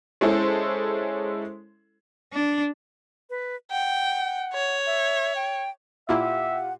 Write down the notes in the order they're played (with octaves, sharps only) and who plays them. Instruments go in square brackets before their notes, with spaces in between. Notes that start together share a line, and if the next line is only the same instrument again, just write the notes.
[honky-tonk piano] G#3 C#4 E4 G#4 A4 C5
[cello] D4
[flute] B4
[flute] F#5 [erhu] G5
[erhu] C#5
[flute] E5
G5
[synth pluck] A#2 A#3 E4 [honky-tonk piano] F4 G4 [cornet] E5 [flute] F#5